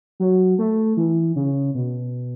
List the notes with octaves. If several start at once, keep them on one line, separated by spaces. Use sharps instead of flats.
F#3
A3
E3
C#3
B2